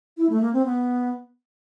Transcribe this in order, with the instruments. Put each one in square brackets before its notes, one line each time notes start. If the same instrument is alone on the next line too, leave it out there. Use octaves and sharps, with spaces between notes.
[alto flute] E4
A3
A#3
C4
B3